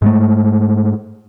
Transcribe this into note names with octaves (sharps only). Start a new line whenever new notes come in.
G#2 G#3 A3